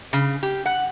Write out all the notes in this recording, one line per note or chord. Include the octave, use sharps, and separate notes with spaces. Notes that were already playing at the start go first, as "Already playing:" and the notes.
C#3
G4
F#5